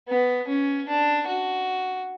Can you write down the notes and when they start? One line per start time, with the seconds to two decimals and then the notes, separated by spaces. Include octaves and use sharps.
0.09 B3
0.48 C#4
0.88 D4
1.27 F#4